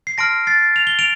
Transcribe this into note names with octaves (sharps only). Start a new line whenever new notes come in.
C7
A5 C6 F6 A#6 D7
A6 C7
F7
G7
D7 F7